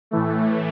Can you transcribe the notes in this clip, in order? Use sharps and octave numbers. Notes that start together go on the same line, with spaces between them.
A2 E3 A3